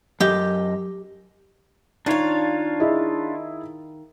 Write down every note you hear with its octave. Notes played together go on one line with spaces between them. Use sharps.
F#2 G4 D#5
D#3 D4 F4 C#5 F5
E4 G#4 D#5